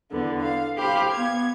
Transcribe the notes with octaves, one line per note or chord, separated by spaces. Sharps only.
E2 D3 B3
F5
G4 C5 F5 B5
B3 G#6